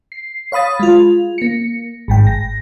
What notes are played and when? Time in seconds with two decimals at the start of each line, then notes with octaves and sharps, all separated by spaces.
0.12 C7
0.52 C#5 F5 B5 D#6 A6
0.79 G#3 F4
1.38 A#3 C#7
2.08 G#1 G#2 G5
2.27 A#6